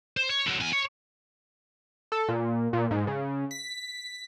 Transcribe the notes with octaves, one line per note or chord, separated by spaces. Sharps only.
C5
C#5
D3 F#3
E2 G#5
C#5
A4
A#2
A#2
G#2
C#3
B6